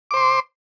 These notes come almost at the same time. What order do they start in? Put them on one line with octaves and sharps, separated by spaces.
D6 C5 C6